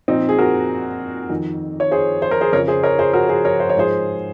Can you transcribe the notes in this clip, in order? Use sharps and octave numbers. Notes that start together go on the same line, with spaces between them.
A#2 F3 C4 D#4
G#4
F#4 A#4
F2 D#3
C#5
G#4 C5
C5
A#4
G#4 C5
F2 C#3 F3 A#4 C#5
G#4 C5
A#4 C#5
G#4 C5
F#4 A#4
G#4 C5
A#4 C#5
C5
C#5
G#2 F3 G#4 C5